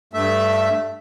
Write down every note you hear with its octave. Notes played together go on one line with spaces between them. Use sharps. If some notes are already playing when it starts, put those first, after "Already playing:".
G2 A3 E5